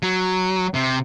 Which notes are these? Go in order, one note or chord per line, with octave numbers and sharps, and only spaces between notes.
F#3
C3